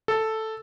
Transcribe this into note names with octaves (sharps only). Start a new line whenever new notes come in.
A4